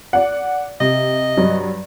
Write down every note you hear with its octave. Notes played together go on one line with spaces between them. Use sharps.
D5 F#5
C3 D#5
G2 F#3